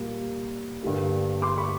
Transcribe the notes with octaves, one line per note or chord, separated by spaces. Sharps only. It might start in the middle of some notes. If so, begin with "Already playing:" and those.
Already playing: A#2 G3 A#3
G2 D3 G3 A#3
C6 D6
B5 C#6